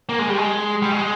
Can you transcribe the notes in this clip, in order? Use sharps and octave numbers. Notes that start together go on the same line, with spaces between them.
A#3
G#3
G3
G#3
G3
G#3